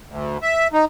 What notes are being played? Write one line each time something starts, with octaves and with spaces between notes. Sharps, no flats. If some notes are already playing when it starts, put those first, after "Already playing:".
D2
E5
D#4